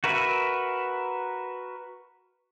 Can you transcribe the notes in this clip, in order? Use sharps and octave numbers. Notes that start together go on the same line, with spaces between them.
F#4 A#4 B4 E5